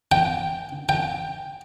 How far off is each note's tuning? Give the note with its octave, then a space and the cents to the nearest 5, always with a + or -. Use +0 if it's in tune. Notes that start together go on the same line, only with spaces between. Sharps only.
G5 -5
G5 +5